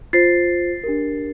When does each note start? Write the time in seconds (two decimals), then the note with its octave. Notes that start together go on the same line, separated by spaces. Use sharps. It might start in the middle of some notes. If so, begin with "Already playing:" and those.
0.13 F4 C5 A6 C7
0.84 D4 G4 A#4